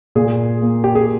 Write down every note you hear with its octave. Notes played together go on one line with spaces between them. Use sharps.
A#2 G#4
A#3
G4
G#4